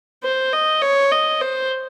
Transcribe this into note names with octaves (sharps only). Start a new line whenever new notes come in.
C5
D#5
C#5
D#5
C5